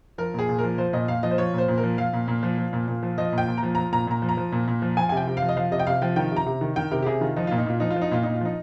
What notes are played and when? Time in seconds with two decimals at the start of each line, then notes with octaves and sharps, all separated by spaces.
0.18 F3 A#4
0.34 A#2 G#4
0.49 A#2
0.58 F3 A#4
0.78 F3 C5
0.93 A#2 D#5
1.08 A#2 F5
1.23 F3 D#5
1.31 C5
1.38 F3 C#5
1.53 A#2 C5
1.68 A#2
1.78 A#4
1.83 F3
1.98 F3 F5
2.13 A#2
2.28 A#2
2.43 F3
2.58 F3
2.73 A#2
2.88 A#2
3.03 F3
3.18 F3 D#5
3.32 A#2
3.38 G5
3.47 A#2
3.57 A#5
3.63 F3
3.75 F3 A#5
3.92 A#2 A#5
4.07 A#2 A#5
4.22 F3
4.29 A#5
4.37 F3
4.52 A#2
4.67 A#2
4.82 F3
4.97 F3 G#5
5.09 G#5
5.12 C3 G5
5.27 C3
5.37 F5
5.42 F3
5.49 D#5
5.57 F3 F5
5.71 C3 D#5
5.79 G5
5.87 C3 F5
6.02 F3 G5
6.16 D#3 G5
6.32 C3 A#5
6.46 C3
6.61 D#3
6.76 D#3 G5
6.91 C3 A#4
7.02 G4
7.06 C3 G#4
7.21 D#3 F4
7.36 F3 D#4
7.47 A#2 F4
7.58 D#4
7.66 A#2 F4
7.80 F3 D#4
7.90 F4
7.96 F3
8.01 D#4
8.11 A#2 F4
8.23 A#2 D#4
8.34 F4
8.41 F3 D#4